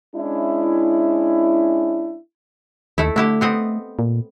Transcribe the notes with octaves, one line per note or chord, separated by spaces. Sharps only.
G#3 C#4 D4 E4
D#2 A3 E4
D3 A3 E4 G4
B3 C4 D#5
A#2